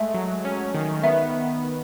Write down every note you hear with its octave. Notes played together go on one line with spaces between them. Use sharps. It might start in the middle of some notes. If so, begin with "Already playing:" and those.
Already playing: G#3 A3 E5
F#3
C#4
D#3
B3 E5